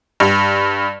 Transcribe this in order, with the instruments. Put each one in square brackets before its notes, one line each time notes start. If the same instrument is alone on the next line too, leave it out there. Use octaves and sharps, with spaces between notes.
[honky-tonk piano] G2